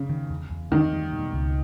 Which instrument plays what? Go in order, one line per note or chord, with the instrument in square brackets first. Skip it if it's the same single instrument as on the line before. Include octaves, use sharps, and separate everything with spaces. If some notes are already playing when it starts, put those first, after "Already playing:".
Already playing: [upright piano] C#3
[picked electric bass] D#3
E2
E2
[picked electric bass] E2 [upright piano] D#3
[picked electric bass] G3
B2
C#2